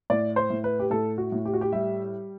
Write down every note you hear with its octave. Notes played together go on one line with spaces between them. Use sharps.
A2 D5
C5
A2
B4
G4
A2 A4
F#4
A2
G4
F#4
G4
G3 E5